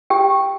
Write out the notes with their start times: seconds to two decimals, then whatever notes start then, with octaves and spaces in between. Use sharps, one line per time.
0.10 G4 G5